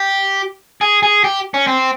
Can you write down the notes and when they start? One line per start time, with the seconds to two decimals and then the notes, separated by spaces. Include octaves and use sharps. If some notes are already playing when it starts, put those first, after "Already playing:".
Already playing: G4
0.81 G#4
1.03 G#4
1.24 G4
1.54 C#4
1.67 C4